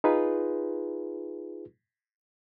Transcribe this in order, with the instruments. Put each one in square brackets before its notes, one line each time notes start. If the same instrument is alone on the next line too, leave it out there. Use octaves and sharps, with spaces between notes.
[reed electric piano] D#4 F4 G#4 B4